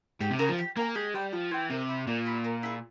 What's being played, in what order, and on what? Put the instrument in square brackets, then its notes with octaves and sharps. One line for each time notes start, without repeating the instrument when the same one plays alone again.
[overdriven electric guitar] G#2 [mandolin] G4
[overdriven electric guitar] C3
[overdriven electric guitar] C#3 [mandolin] A#4 F5 G#5
[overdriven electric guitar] F3
[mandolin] G4
[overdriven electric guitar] A#3 [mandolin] A#4 F5 G#5
[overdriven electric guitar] G#3 [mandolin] G4
[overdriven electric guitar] G3 [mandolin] C5 G5
[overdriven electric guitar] F3 [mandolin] G4
[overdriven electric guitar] E3 [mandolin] C5 G5
[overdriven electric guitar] C3 [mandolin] A#3
[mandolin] E4 G4
[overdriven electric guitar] A#2 [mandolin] A#3
[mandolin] E4 G4
A#3
E4 G#4